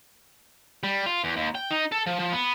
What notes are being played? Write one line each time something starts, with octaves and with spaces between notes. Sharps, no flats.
G3
F4
E2
D#2
G5
D#4
A4
F3
F3
B3